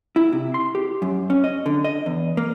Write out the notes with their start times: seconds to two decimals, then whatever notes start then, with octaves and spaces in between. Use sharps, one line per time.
0.16 E4
0.33 C3
0.54 C6
0.75 G4
1.02 F#2
1.30 C#4
1.44 D#5
1.66 D3
1.84 D#5
2.06 E2
2.37 A#3